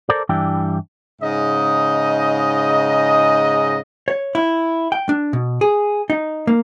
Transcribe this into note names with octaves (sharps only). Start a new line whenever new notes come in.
A4 A#4 C5 D5
G2 E3 G3 D4 E4 G5
G#2 C#3 D#4 D#5
C#5
E4
G5
D4
B2
G#4
D#4
A#3